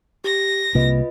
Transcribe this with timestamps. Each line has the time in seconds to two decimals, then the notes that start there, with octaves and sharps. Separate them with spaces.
0.24 G4 A#6
0.75 C2 C3 A#3 F4 B4 D#5